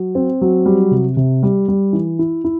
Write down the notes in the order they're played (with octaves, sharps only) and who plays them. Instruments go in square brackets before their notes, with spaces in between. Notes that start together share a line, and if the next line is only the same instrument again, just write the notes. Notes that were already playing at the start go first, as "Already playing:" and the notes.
Already playing: [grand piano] F#3
C4
F#3
G3
C3
C3
G3
G3
E3
E4
E4